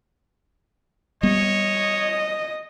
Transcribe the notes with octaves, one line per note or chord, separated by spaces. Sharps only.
G3 B3 C#5 D#5